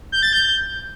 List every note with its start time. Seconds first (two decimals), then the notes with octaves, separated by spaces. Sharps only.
0.12 G6
0.23 A6
0.33 G6